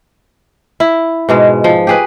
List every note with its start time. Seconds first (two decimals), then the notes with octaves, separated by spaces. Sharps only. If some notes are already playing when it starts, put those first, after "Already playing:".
0.80 E4
1.29 G#2 B2 G#3
1.64 F3
1.87 G4 G#4 B4